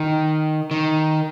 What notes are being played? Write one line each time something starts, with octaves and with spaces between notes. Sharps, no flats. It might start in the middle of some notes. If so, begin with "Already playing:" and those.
Already playing: D#3
D#3